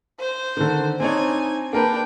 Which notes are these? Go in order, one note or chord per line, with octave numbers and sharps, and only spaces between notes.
C5
D3 D#3
C4 D4 D#4 C#5 G#5
A#3 D4 A#4 B4 G5